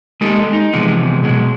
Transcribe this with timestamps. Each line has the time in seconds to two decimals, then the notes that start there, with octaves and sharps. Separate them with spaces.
0.21 G#3 A#3 D#4 G4 A4
0.53 D#4
0.73 C3 E3 F3 G#3 B3
1.23 B2 F#3 G#3